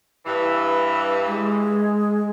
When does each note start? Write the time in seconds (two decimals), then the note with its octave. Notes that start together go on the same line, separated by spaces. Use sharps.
0.25 G2 E3
1.25 G#3